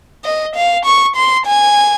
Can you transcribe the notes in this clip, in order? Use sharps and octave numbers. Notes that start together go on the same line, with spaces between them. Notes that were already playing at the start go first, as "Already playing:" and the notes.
D#5
F5
C#6
C6
G#5